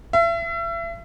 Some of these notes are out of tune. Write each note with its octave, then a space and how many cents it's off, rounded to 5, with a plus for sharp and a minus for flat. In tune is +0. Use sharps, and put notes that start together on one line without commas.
E5 +35